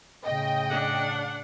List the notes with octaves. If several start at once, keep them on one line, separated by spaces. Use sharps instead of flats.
A2 C#3 D#5 G5
D4 F#5